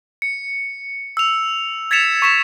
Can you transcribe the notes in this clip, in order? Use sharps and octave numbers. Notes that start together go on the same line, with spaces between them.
C#7
E6 F7
G#6 A6 B6 C#7 E7 F7
C#6 B6 E7